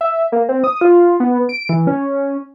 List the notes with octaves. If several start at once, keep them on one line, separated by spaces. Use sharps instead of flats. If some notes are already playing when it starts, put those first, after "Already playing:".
E5
A#3
C4
D#6
F4
B3
D7
E3
C#4